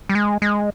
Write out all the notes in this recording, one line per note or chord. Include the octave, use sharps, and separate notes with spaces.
G3
G#3
G#3